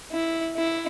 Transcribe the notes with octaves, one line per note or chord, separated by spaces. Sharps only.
E4
E4